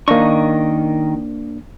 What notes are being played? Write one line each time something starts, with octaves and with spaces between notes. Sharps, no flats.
D#3 A#3 D4 D#5 C#6